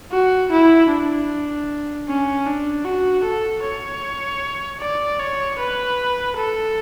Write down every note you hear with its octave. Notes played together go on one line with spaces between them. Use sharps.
F#4
E4
D4
C#4
D4
F#4
A4
C#5
D5
C#5
B4
A4